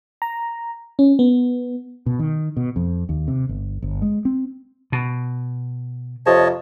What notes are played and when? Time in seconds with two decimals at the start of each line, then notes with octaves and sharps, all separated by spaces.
0.22 A#5
0.99 C#4
1.19 B3
2.06 B2
2.19 D#3
2.57 B2
2.76 F2
3.09 D#2
3.28 C3
3.49 G1
3.82 G1
4.02 G#3
4.25 C4
4.92 B2
6.26 F2 C3 C#5 D#5 A5